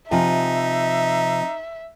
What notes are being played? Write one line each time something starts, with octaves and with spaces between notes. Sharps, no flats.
C3 F3 D#4 E5 G#5